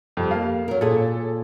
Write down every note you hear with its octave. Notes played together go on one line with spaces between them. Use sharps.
F2 G3
A#3 F5
F#3 A#4
A#2 G#4 A4